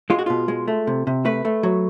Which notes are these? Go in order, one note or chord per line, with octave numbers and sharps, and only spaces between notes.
G#3 F4
F#4
B2 F4
G#3
A3
C3
C3
A3 B4
A3
F#3